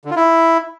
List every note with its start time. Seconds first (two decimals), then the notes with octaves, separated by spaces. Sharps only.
0.05 D3
0.11 F4
0.16 E4